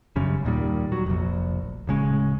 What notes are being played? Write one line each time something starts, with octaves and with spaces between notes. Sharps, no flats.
F#2 C#3 G3
D#2 A#2 D#3 G3
F#3
F1 A#1
D1 C#3 G#3 C#4